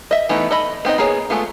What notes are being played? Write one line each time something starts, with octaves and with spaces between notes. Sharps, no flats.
D#5 E5
E3 A3 B3 D#4
A4 D#5 B5
B3 C4 D#4 D#5
A#3 B3 G#4 C#5
G#3 A3 B3 F4